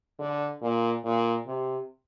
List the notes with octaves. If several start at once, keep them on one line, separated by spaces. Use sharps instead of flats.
D3
A#2
A#2
C3